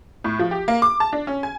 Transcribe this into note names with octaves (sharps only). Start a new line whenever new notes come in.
A2
F3
G4
A#3
D6
A5
D4
C#4
G#5